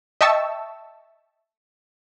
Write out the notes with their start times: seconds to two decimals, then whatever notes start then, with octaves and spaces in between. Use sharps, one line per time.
0.21 D#5 E5 G5 A5 C#6 E6